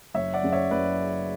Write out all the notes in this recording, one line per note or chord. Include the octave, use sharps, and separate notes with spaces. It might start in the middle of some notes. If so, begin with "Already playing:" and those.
F#1 C#5 E5
D5 F#5
F#2 C#3
C#5 E5
F#1 B4 D5